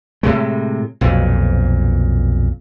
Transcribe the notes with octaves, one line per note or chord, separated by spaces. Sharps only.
A2 C3 G#3
B1 F2 A#2